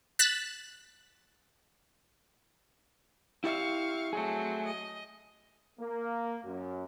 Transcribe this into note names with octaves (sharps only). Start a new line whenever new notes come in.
F#6 A6 B6 E7
E4 G4 E5 F5 C#6
F#3 A3 C4 G#4
D#5
A#3
F#2